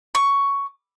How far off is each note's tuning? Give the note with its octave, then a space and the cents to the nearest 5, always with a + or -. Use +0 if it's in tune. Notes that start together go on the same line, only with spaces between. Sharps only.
C#6 +10